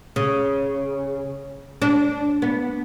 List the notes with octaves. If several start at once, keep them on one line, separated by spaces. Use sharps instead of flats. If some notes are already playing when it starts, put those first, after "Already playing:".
C#3
D4
B3